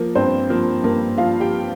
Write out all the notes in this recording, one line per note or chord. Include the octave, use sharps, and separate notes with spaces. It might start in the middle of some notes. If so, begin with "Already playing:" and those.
Already playing: F3 A#3 A#4
G2 C4 C5
F3 A#3 A#4
G2 A#3 A#4
F3 F4 F5
G4 G5